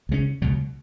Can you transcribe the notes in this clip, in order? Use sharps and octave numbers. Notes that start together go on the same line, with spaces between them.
C#2 C#3 G#3 C#4
C#2 B2 F#3